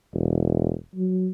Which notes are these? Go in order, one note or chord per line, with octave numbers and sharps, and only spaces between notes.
E1
F#3